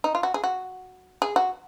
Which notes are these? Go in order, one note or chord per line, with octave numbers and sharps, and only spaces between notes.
D#4
F4
F#4
G#4
F#4
G#4
F#4